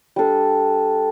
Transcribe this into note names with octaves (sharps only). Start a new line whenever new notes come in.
G3 D4 A4